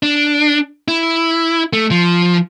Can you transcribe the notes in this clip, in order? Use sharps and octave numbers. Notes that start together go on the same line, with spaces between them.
D4
E4
A3
F3